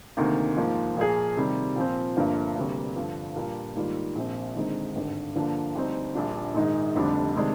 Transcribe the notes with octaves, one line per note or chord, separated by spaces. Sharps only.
D2 C3 D#3 A#3
G#2 F3 A#3
A#2 F3 A#3 F4 G#4
C3 D#3 G3
A#2 F3 C4
G1 G2 D3 F3 A#3
D2 C3 G3 A#3
G2 D3 F3
A#2 G3 D4 F4 A#4
G#2 D#3 G3 A#3 F4
A#1 A#2 F3 C4
D#2 D3 G#3 C4 D#4
G#1 G2 D3
G2 D3 F3 A#3
D2 D3 G3 C4 D#4
A#1 A#2 G3 D4 F4
A#1 G#2 D#3 G#3 D#4
F1 F2 D3 G3 D4
C3 D#3 G#3 D4